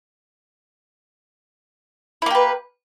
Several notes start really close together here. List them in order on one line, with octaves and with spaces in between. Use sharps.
E4 A#3 G4 B4